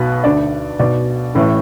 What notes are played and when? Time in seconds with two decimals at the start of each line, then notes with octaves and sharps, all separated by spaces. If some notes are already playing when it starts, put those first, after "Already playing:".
Already playing: B1 B2 B4
0.24 D2 D3 D5
0.79 B1 B2 D5
1.35 A1 A2 E3